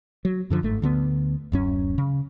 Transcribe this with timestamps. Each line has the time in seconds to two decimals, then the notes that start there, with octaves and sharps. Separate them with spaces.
0.25 F#3
0.50 F#2 D3 F3
0.63 G1 G#2 A3
0.82 D2 D3 B3
1.52 D1 F#2 C#4
1.98 C#3